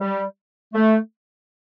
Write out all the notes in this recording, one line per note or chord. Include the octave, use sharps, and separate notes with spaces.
G3
A3